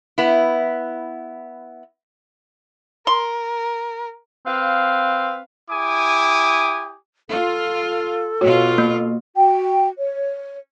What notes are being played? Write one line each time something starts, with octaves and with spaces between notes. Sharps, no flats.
B3 E4
A#4 C6
C4 B4 F5
E4 G4 G#5 D6 D#6
F4 A4
B2 F4 F#4 C#5
A#3
F#4 G5
C#5